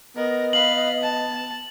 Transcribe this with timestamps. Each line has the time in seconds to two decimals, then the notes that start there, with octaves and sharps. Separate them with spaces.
0.16 B3 A#4 D#5
0.53 B4 F5 F#7
1.02 A5